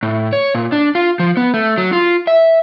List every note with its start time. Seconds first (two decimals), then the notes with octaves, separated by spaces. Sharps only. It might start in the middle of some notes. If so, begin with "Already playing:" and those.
0.03 A2
0.33 C#5
0.55 A#2
0.72 D4
0.95 F4
1.19 F3
1.37 B3
1.54 A3
1.78 F#3
1.93 F4
2.27 E5